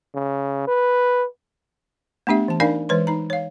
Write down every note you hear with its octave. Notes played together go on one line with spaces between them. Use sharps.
C#3
B4
A3 B3 D4 G4 E5
E3 A5
D4 D#4 A#4 D5 F5 G#5
E3 G#3 B4 C#5 C6
D#4 A#5
C#5 F5